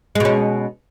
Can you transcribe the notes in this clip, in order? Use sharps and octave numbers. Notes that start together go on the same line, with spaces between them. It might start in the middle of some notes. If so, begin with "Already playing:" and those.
B2 G#3 C#4